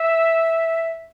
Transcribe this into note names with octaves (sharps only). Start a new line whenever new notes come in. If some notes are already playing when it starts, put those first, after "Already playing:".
Already playing: E5